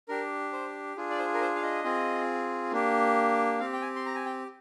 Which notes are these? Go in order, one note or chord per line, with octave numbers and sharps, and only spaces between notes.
D4 G4 A#4
C5
D4 F4 G#4
D5
C5
A#4
C5
F5
D#5
C4 F4 G#4
A#3 D4 G4
C4 G4 F5
G5
G#5
C6
A#5
G#5
G5